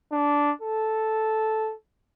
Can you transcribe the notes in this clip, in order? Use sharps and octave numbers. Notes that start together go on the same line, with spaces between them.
D4
A4